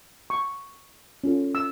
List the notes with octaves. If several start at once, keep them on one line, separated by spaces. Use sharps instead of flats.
C#6
C#4 F4 A4
E6